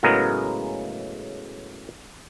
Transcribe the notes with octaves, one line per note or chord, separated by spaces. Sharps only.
A2 C#3 F#3 G#3 B3 A#4